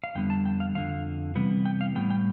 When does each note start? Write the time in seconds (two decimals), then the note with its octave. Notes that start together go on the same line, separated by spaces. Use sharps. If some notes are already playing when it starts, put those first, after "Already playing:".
0.04 F5
0.15 F2 D3 G3 B3 G5
0.30 A5
0.45 G5
0.60 F5
0.75 F2 D3 F3 F5
1.35 C3 E3 G3 B3
1.66 G5
1.81 F5
1.95 A2 G3 B3 G5
2.10 G5